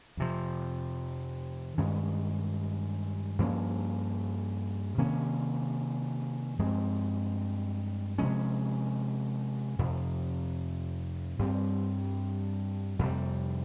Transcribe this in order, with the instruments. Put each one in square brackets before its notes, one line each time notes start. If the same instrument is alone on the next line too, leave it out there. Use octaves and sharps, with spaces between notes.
[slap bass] F2 C3 F3
G2 D#3 G#3 C#4
G2 F3 A#3 C#4
C3 D#3 A#3 C#4
G2 F3 G#3 C4
C3 F3 G#3 C#4
F2 C3 F3
G2 G3 C4
F2 C3 G3